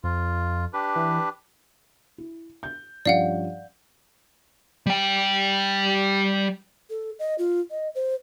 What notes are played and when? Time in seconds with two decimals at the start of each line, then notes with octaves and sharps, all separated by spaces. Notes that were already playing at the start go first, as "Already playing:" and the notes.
0.04 F2 F4
0.73 D4 G4 B4
0.96 E3
2.18 E4
2.63 G6
3.06 G2 F3 C#4 D5 F5 F#5
4.86 G3 G5
6.90 A4
7.19 D#5
7.38 F4
7.71 D#5
7.95 C5